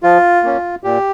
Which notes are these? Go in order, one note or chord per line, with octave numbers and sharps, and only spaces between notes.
F3 F4
A#3 C#4
A#2 G4